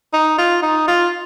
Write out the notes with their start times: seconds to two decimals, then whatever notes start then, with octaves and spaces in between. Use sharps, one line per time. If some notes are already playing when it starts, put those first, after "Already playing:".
0.14 D#4
0.38 F4
0.63 D#4
0.88 F4